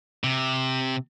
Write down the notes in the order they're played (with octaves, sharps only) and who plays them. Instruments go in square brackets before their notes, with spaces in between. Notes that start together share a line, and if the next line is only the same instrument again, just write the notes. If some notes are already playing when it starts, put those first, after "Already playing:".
[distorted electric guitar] C3